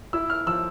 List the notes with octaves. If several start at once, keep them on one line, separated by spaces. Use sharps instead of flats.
E4 E6
F6
F3 E6